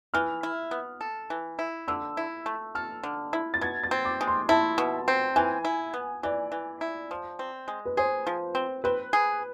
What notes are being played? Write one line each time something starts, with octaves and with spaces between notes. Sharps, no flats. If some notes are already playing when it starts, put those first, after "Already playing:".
E3 F6
E4
B3
A4
E3
E4
D3 E6
E4
A3
A4 F6
D3
E4
A6
B2 G#6
A6
C4
D6
G#3
C6
E4 A5
B2
C4
E3 G#5
E4
B3
E3 D5
E3
E4
F3
C4
G#3
B4
G#4 C5
F3
C4
C4 B4
G#4